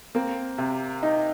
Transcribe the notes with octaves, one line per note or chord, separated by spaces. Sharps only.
A#3 C4
C3
D#4